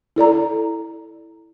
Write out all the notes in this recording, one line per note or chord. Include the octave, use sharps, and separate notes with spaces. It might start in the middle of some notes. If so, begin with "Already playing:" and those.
E4 A4 D5 A#5